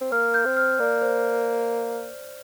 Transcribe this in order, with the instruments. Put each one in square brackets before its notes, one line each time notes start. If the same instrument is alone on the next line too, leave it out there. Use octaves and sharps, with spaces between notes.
[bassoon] C4
[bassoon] A#3 [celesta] F6
[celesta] G6
[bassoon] C4
[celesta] F6
[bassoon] A#3 [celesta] D5
[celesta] C5